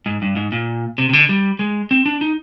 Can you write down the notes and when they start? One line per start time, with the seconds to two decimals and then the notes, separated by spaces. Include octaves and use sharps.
0.06 G#2
0.22 G2
0.36 G#2
0.52 A#2
0.98 C3
1.09 C3
1.13 D3
1.29 G3
1.59 G#3
1.91 C4
2.06 D4
2.21 D#4